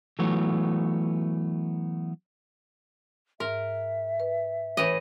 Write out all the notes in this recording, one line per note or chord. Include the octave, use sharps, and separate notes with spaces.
E3 F#3 A3 B3 C#5
G#2 A#4 E5
B4
A2 E3 D#5